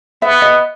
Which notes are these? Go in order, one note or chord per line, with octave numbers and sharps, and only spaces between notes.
B3 E5
D#5